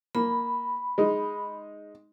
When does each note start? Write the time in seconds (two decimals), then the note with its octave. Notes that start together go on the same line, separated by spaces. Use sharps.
0.15 A#3 B5
0.98 G#3 D#4